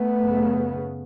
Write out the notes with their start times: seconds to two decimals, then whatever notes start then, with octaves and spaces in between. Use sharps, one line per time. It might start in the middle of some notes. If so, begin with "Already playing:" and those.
Already playing: A3 B3
0.18 F#2 C#3